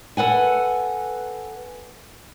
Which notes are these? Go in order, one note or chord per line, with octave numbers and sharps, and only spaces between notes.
A4 B4 F#5 G#5